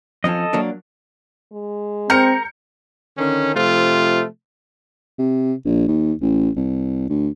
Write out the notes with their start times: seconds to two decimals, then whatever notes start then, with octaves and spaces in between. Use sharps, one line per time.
0.24 F2 F3 C#4 A4 D#5
0.53 F#3 A#3 D4
1.52 G#3
2.10 C4 A#4 G6 C#7
3.18 D3 D#3 C#4
3.55 C3 F3 A3 F4
5.19 C3
5.65 A#1
5.88 D#2
6.21 A1
6.57 C2
7.09 D2